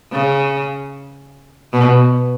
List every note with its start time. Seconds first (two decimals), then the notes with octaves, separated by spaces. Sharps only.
0.12 C#3
1.73 B2